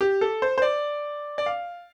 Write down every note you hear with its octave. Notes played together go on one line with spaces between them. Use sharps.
G4
A4
C5
C5
D5
D5
F5